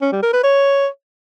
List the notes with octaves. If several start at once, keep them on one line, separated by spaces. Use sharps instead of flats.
C#4
G3
A#4
B4
C#5